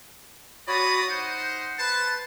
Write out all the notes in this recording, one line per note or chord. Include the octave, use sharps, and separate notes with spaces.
F#4 C#5 D5 A#5 B5 D#6
D#4 C5 F#5
B4 C5 A5